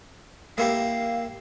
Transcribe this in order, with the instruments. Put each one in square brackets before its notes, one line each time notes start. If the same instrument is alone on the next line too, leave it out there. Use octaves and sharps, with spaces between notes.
[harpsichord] A#3 E4 G4 [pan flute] F5